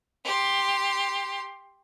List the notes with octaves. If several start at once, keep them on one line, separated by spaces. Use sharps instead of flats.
G4 C6